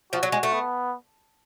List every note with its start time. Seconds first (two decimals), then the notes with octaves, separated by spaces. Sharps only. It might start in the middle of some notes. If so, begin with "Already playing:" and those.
0.12 F3 F#4
0.23 F#3
0.32 G#3
0.43 A3
0.53 B3